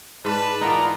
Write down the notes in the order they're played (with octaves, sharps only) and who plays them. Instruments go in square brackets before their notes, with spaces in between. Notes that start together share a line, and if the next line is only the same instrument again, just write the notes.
[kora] G#2 [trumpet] B4 [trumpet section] D5 A5
[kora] E3 B3 D#4 [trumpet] F4 [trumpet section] A#4 D5 [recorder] A#5